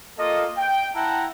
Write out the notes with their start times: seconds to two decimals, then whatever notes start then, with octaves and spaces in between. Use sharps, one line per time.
0.18 A#3 F4 A4 D#5
0.58 G5
0.95 E4 F#5 G5 A5 A#5